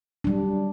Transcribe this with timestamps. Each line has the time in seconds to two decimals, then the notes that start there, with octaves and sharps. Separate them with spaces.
0.24 D4
0.27 G3
0.30 F#3